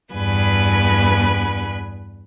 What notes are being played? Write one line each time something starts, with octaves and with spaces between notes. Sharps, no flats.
E2 G2 B4 G#5 B5